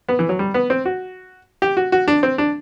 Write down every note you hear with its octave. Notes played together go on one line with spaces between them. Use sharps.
B3
E3
F#3
G3
B3
C4
F#4
G4
F#4
F#4
D4
C4
D4